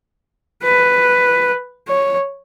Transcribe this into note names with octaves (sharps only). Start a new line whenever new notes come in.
B4
C#5